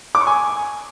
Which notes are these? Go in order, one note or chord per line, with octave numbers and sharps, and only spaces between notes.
D6
C#6
G#5